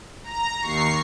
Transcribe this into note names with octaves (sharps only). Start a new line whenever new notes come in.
A#5
D#2 C#6 C7